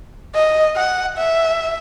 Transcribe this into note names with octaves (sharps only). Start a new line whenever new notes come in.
D#5
F#5
E5